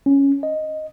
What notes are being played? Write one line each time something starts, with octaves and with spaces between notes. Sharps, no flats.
C#4
D#5